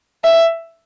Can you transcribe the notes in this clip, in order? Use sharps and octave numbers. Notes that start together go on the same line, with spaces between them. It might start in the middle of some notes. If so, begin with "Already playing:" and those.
E5